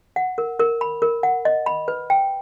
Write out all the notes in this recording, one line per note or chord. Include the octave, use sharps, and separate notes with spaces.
F#5
A#4
A#4
B5
A#4
F#5
D#5
B5
B4
G5